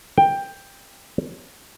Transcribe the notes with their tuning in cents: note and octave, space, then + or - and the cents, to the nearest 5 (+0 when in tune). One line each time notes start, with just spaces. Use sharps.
G5 +10